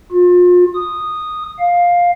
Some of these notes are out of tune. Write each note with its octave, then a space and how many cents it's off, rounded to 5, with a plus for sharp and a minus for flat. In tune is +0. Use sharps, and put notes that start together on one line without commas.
F4 +35
D#6 -10
F5 +10